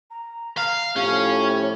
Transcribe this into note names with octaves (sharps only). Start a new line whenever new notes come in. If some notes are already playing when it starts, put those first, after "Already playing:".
A#5
F5
A2 F3 C#4 G4 F5
C#5